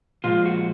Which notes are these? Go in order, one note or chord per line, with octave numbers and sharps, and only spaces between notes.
A#2 F3 G#3 F4
F#4